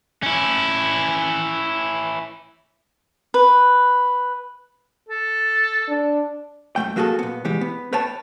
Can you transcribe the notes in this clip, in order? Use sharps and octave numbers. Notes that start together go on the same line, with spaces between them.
C#4 E4
B4
A4
D4
F#2 A#2 A3 G5
F#3 A#3 F#4 G#4 A4
A#2 B3
C2 E3 G3 G#3 G4
B3
B4 C#5 G5 A5